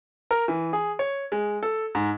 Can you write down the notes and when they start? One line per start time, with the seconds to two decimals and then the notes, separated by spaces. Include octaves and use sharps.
0.31 A#4
0.48 E3
0.73 G#4
0.99 C#5
1.32 G#3
1.63 A4
1.95 G#2